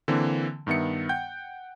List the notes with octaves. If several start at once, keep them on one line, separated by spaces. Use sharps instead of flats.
D3 E3 A#3 C4
G2 D#3 B3 E5 C#7
F#5 G5 G6